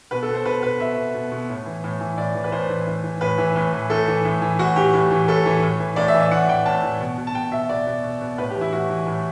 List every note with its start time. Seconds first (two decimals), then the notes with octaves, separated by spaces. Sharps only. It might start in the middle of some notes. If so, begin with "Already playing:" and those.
0.11 B2 B4
0.23 A4
0.28 B2
0.34 C5
0.45 B2 B4
0.63 B2 B4
0.80 B2 E5
0.97 B2
1.14 B2
1.31 B2
1.49 A2
1.66 E3
1.84 A2
2.00 E3
2.18 A2 D5
2.35 E3
2.44 B4
2.52 A2 C5
2.69 E3
2.87 A2
3.04 E3
3.21 A2 B4
3.38 E3
3.56 A2
3.73 E3
3.90 A2 A4
4.08 E3
4.25 A2
4.42 E3
4.59 A2 F#4
4.76 E3 G4
4.93 A2
5.11 E3
5.28 A2 A4
5.45 E3
5.63 A2
5.80 E3
5.96 A2 D5
6.08 E5
6.14 E3
6.20 E5
6.31 A2 F#5
6.49 E3 G5
6.66 A2 A5
6.83 E3
7.00 B2
7.18 B2
7.27 A5
7.34 B2 G5
7.52 B2 E5
7.69 B2 D5
7.86 B2
8.04 B2
8.21 B2
8.38 A2 B4
8.50 G4
8.55 E3
8.61 E4
8.72 A2 F#4
8.89 E3
9.07 A2